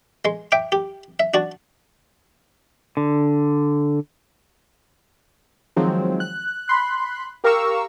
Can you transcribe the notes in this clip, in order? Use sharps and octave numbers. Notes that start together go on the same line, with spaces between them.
G#3 C6
E5 G5 D6
G4
E5
D4 F#4 A5
D3
D#3 F3 F#3 G#3 C4
F#6
B5 C6 F#6
G4 A#4 F5 A#5 C#6 E6